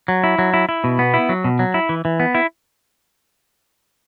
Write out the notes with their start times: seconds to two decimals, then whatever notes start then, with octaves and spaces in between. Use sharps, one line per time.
0.08 F#3
0.24 E4
0.39 F#3
0.54 E4
0.69 E4
0.84 B2
0.99 B3
1.14 E4
1.29 F#3
1.44 B2
1.59 F#3
1.74 E4
1.89 E3
2.05 E3
2.20 B3
2.35 E4